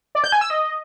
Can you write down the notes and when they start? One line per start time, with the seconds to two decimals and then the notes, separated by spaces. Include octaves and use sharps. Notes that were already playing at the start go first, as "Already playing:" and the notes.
0.15 D5
0.24 G6
0.32 G#5
0.41 E6
0.50 D#5